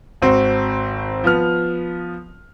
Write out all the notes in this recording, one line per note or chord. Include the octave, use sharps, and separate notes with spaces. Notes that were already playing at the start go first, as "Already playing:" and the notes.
G#1 C4 F#4 C5
F3 B3 F6